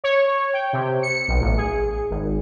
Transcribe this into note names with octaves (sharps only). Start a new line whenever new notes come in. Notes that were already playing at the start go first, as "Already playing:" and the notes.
C#5
G5
C3
C#7
B1
A1
G#4
G#1